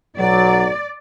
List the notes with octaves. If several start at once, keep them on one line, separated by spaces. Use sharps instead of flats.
B1 F#3 D5